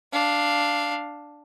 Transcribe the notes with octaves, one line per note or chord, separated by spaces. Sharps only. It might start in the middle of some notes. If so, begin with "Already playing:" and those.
D4 F5